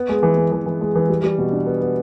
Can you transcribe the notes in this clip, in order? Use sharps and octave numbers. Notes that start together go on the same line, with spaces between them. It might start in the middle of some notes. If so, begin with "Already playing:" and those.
Already playing: B3
G#3
E3
G#3
E3
E3
G#3
E3
G3
G3
B2
D4
B3
B3